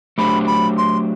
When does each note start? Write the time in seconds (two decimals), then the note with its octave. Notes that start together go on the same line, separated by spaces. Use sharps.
0.18 F#3 A3 D4 G4 C5 B5
0.47 B5
0.78 C6